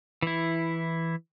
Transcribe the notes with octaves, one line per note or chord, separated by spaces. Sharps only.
E3 E4